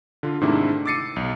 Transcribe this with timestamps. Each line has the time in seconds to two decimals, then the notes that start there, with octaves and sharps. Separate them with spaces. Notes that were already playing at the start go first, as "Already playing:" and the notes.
0.23 D3 F4
0.41 G#2 C3 D#3 A3 D4 E4
0.86 D6 E6 A6 C7 C#7 D#7
1.16 B1